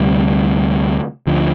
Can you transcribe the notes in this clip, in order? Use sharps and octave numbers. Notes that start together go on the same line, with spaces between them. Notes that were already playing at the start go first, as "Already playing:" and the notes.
Already playing: D2 C3 G3
D2 D3 F3